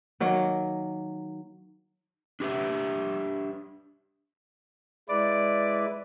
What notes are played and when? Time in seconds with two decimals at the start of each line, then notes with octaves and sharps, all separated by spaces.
0.20 D#3 F#3 A#3
2.40 D4 G4 B4 E5
5.09 G#3 E4 B4 D5